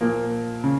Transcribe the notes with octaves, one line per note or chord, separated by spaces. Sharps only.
A#2 F3 A#3
C#3